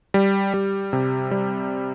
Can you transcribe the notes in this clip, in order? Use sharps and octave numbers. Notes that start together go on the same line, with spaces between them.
G3
G3
C3
G3